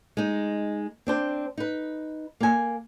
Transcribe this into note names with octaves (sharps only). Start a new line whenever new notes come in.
G#3 D#4
C4 D4 C5
D#4 B4
A#3 G#5